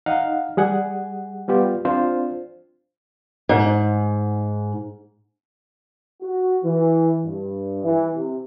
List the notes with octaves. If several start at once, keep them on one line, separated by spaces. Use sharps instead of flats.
D#4 D#5 F5 F#5
G3 G#4 F#5
G3 B3 F4 G4
C4 D4 F4 C5
G#2
F#4
E3
G2
E3
C3